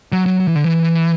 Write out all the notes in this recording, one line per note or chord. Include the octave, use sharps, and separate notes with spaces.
F#3
F#3
F#3
E3
D3
E3